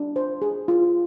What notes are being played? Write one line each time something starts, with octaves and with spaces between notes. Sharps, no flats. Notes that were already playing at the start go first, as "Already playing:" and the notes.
Already playing: D4
C5
G#4
F4